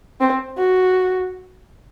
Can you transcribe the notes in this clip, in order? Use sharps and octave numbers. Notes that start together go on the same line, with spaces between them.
C4
F#4